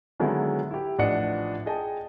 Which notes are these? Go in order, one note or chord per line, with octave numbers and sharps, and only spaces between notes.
D3 D#3 F#3 G#3 B3 E4
E4 G4
A1 F3 D4 D#5 F#5 C#7
G#4 D#5 G5 A5